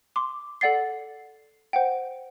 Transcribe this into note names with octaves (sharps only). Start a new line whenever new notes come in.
C6 D6
A4 D5 F#5 A6 C7
C5 F#5 G5